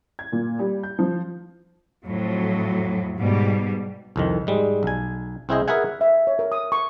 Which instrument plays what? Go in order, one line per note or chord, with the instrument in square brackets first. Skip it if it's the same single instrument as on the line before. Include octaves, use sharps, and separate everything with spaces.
[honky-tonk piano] G#6
A#2
G3
G6
F3
[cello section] F2 A2 F#3
G#2 B2 G3
[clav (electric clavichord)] C2 F2 D#3
G#2 G3 G#3
B1 G#5
C2 C4 E4 G#4 C5 D#5
G#4 A#4 B4 E5 F#5 G#5
[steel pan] E5
C#5
A#4
D#6
C#6